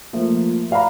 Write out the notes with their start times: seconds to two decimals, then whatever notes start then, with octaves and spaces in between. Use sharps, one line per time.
0.13 F3 A3 A#3 F4
0.71 D5 F5 F#5 A#5 B5